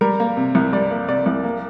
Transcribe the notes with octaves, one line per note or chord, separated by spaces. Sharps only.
G3 A#4
A#3
C3
C2
G3 D5
A#3
C3 D5
C2
A#3